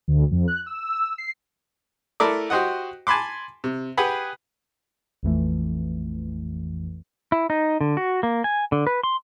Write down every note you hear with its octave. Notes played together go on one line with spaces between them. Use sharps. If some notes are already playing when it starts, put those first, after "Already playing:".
D2
F2
F#6
E6
C7
A3 E4 A4 A#4 D5
F#4 G4 C5 D#5 F#5
G#5 A5 B5 C6 D6
C3
G4 G#4 B4 F#5 B5
A#1 F2 E3 A3
E4
D#4
D3
F#4
A#3
G#5
D3
B4
C6